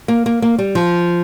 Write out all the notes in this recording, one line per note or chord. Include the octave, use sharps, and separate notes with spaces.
A#3
A#3
A#3
G3
F3